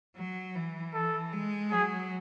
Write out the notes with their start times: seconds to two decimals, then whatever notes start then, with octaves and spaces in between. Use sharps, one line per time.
0.16 F#3
0.55 E3
0.94 A4
1.33 G#3
1.71 F#3 G#4